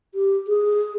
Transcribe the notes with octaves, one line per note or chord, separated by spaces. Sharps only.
G4
G#4